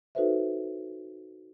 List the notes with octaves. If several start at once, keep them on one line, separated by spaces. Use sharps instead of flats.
D#4 F#4 A4 B4 C5 E5